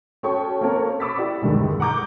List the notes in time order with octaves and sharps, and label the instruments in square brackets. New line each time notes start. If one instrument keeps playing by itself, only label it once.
[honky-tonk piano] C#4 F#4 A4 G5 A5 C#6
A#3 C4 C#4 A4 A#4 C#5
B5 C#6 D6 E6 A6 B6
E4 G4 D5 F#5
B1 E2 G2 D3 D#3 G#3
F#5 A#5 D6 G6